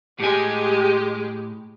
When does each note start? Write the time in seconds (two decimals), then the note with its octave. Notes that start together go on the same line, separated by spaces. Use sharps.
0.20 A2 G#3 G4 G#5